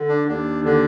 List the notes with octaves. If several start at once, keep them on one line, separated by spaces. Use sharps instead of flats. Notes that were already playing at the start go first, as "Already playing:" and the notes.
Already playing: D3
D4
D#2 D4
D3 D4